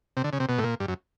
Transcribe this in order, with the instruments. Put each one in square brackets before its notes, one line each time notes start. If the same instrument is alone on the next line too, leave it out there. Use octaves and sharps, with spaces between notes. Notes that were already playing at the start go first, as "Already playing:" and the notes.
[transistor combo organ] C3
D3
C#3
C3
B2
A2
A#2
G2
F#2